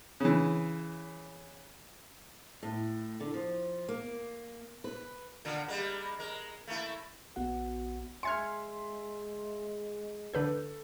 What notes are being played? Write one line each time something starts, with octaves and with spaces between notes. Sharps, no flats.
C#3 E3
A2
D3
F3
A#3
B4
A#2 D3
G3 G#3 A#3
G#3 A#4
A3 A#3 E4
A#1 B3 F#4 F#5
G#3 E5 G#5 C6 F6 G#6 C#7
D3 A4 B4 G6